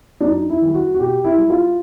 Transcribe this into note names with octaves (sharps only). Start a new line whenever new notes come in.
D4
F#2 D#4
E4
D#3 G3
F#4
F#4
B2 G4
E4
G3
F4